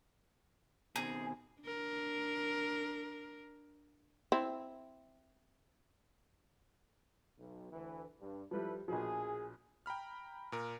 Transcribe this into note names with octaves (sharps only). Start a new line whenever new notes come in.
B2 D#3 C4 G#4
D4 A#4
C4 E4
B1
D2 E3
G2
F3 G3 E4 A4 B4
A#1 B2 F3 G#4
G5 A#5 B5 F6
A#2 A#4